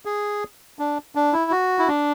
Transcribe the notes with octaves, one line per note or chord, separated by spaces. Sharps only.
G#4
D4
D4
E4
F#4
E4
D4